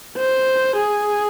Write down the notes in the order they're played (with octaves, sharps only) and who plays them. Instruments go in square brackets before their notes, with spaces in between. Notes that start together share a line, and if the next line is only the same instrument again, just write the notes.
[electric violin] C5
G#4